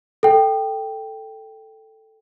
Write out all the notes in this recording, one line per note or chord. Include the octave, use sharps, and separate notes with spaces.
A4 G5